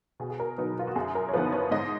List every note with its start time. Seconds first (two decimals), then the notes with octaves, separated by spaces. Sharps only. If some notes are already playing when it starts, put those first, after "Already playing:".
0.20 B2 G#4
0.30 G#4
0.40 A#4
0.58 F#3 B3 D#4 B4
0.79 F4
0.87 F#4
0.96 F#2 G#4
1.15 A#4
1.29 C#5
1.33 F3 B3 D#4 B4
1.52 C#5
1.71 G#2 D#5